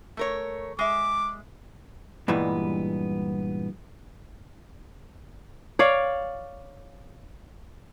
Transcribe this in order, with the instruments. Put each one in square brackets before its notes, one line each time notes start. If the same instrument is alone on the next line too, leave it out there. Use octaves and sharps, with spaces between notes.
[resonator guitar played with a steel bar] A3 A#4 C#5
[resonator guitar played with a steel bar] G#3 E5 [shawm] D6
[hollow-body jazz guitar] G2 A#2 E3 G3 G#3 B3
[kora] C#5 D5 F5